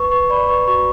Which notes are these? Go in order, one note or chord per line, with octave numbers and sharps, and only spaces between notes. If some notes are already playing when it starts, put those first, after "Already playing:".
Already playing: B4 C#6
B4 C#6
D5 B5
B4 C#6
F#4 C#6